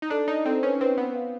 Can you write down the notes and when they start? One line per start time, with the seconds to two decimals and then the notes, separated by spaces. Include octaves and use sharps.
0.02 D#4
0.10 D4 A4
0.28 D#4 D5
0.45 C4 A4
0.63 C#4 B4
0.80 C4 B4
0.97 B3 B4
1.15 F5